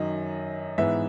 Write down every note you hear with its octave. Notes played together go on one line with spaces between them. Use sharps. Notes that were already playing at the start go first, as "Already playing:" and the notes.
Already playing: F#2 D#3 F#3 D#5
G#2 E3 B3 E5